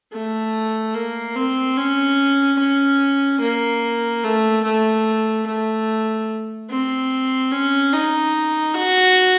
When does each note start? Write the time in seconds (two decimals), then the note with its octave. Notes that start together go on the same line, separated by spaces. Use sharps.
0.13 A3
0.95 A#3
1.36 C4
1.78 C#4
2.59 C#4
3.41 A#3
4.23 A3
4.64 A3
5.47 A3
6.70 C4
7.52 C#4
7.93 D#4
8.74 F#4